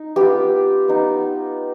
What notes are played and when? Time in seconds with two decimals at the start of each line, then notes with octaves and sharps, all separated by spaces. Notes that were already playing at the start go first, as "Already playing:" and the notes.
Already playing: D#4
0.16 B3 F4 G4
0.88 B3 D#4